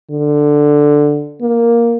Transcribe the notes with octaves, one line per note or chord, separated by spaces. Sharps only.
D3
A#3